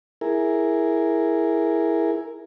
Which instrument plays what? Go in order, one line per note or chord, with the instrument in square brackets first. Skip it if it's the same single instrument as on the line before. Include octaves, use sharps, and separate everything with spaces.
[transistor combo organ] E4 G#4 A#4